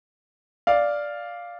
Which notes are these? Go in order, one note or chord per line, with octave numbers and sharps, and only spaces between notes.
D5 F5